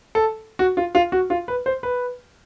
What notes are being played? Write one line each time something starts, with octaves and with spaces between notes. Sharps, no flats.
A4
F#4
F4
F4
F#4
F4
B4
C5
B4